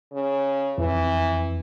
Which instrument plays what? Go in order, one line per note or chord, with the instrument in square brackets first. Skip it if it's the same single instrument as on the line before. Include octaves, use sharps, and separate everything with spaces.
[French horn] C#3
[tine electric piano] F2 [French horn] E3